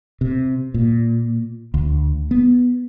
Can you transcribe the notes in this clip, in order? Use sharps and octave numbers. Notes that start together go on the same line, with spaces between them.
C3
A#2
D2
B3